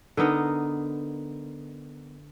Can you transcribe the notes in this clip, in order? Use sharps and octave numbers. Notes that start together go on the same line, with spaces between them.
D3 B3 D#4 A#4